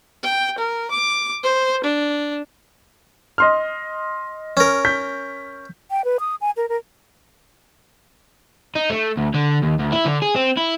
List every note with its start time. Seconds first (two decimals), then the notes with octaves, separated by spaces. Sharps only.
0.23 G5
0.58 A#4
0.90 D6
1.43 C5
1.83 D4
3.38 D#5 C6 F6
4.57 C#4 A#4
4.85 G6 B6
5.91 G5
6.05 B4
6.20 D#6
6.41 G#5
6.57 A#4
6.69 A#4
8.75 D#4
8.90 A3
9.17 D2
9.34 D3
9.62 D#2
9.79 D2
9.92 E4
10.06 D3
10.22 G#4
10.36 C4
10.58 E4